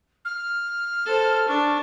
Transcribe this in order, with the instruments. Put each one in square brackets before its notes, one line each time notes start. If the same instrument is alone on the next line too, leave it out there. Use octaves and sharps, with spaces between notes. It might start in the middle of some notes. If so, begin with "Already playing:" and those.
[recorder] F6
[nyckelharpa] A4 C5
[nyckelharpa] D4 [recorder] C#6